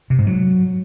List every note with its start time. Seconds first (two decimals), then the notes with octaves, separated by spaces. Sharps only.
0.10 C3
0.19 G#2
0.27 F#3